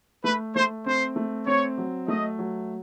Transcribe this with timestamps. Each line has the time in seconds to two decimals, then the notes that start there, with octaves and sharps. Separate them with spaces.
0.24 A3 B4
0.55 A3 C5
0.86 C4 C5
1.16 A3
1.46 C4 C#5
1.78 F#3
2.08 A3 D#5
2.39 F#3